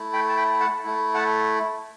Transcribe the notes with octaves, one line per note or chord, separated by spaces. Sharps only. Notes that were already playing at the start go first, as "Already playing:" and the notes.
Already playing: A3 E4
G5 B5
A5
G5 B5
F#5 A5
A3 E4
F#5 A5